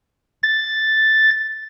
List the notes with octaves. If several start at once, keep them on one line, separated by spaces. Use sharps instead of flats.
A6